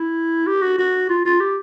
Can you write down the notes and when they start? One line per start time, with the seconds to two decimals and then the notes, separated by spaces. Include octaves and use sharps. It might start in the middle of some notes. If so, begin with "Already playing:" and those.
Already playing: E4
0.47 G4
0.62 F#4
0.79 F#4
1.09 F4
1.25 F4
1.40 G4